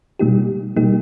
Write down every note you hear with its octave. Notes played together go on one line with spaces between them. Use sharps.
B2 G3 A#3 D#4 G4
B2 G3 A#3 D#4 G4